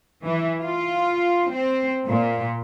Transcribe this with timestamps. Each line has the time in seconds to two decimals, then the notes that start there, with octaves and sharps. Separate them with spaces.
0.23 E3
0.61 F4
1.52 C4
2.07 A#2